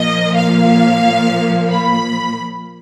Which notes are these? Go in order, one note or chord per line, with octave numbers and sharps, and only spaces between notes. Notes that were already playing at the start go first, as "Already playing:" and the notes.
Already playing: A#2 F3 A#3 D#5
F5
B5